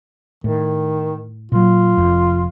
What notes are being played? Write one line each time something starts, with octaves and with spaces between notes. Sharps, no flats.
A2 D#3
A#2 F#3 F4
F1 F2